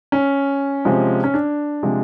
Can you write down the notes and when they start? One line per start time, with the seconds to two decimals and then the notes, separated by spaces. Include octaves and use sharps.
0.12 C#4
0.85 C3 F3 G#3
1.24 C#4
1.34 D4
1.83 C3 F3 G#3